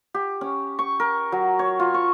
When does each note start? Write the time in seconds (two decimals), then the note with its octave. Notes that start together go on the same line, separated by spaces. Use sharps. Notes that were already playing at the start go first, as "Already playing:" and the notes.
0.14 G4
0.41 C#4
0.79 C#6
1.00 A#4
1.32 F#3
1.59 C#5
1.80 F4
1.94 C#6